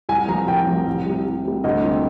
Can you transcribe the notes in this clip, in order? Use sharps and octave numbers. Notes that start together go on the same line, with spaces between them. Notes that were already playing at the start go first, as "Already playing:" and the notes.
C2 G#5
C3 F3 A#5
C2 G5
C3 F3
C2
C3 G3
C2
C3 G3
D2 D#5
C3 G3 C4